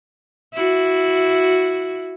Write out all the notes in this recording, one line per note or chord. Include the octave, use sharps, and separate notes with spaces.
E4 F#4